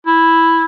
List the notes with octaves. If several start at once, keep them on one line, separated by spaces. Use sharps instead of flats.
E4